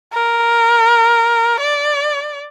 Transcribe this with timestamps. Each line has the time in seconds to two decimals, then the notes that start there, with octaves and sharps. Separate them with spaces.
0.13 A#4
1.60 D5